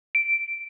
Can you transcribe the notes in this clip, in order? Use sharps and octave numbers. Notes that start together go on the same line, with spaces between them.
D7